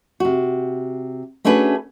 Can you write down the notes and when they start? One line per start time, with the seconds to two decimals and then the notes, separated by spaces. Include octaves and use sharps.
0.20 C3 F#4
1.45 A3 C#4 D4 F#4 G#4 B4